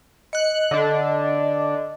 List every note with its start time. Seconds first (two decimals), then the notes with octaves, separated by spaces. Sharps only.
0.33 D#5 F#6 C#7
0.71 D3 D4